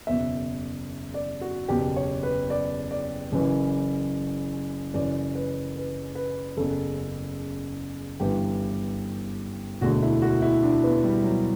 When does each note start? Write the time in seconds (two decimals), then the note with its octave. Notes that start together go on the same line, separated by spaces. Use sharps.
0.07 F#1 E2 B2 E5
1.14 D5
1.41 F#4
1.68 F#1 E2 B2 G4
1.96 C#5
2.23 B4
2.50 D5
2.91 D5
3.32 F#1 F#2 E3
4.94 F#1 F#2 E3 D5
5.35 B4
5.76 B4
6.15 B4
6.57 F#1 E2 C#3 A4
8.20 G1 G2 E3 G4
9.81 E1 D2 D3 F#4
10.03 E4
10.22 F#4
10.42 E4
10.63 D4
10.84 B3
11.04 G3
11.24 F#3